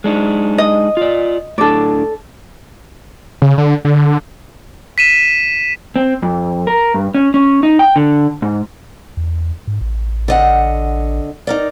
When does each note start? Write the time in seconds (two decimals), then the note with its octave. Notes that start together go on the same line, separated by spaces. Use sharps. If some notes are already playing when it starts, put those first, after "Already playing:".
0.04 G#3 D4 D#4
0.58 D#5
0.97 F4 D5
1.58 A2 D4 A4 D5
3.42 C#3
3.58 D3
3.85 D3
4.98 B6 D#7 E7
5.96 C4
6.22 F2
6.67 A#4
6.94 G2
7.15 C#4
7.34 C#4
7.63 D#4
7.79 G5
7.96 D3
8.42 G#2
9.17 E2
9.67 G#2
9.81 A1
10.28 D3 D#5 F#5
11.47 D#4 A#4 D5